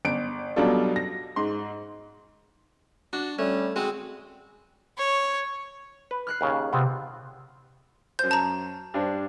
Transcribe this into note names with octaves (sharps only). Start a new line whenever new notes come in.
G1 D7
B2 F#3 G3 D4 F4 A4
A#6
G#2 C6
D4 F#4
G3 A3 C#4
G#3 C4 F#4 G#4
C#5
B4
F6 F#6 C7
D#2 C#3
C3 B3 C4 F4
F#2 C5 G6
A5 A#5
G2 D4 C5